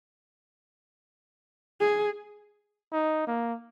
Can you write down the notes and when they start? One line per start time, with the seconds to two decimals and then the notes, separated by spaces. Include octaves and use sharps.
1.81 G#4
2.93 D#4
3.27 A#3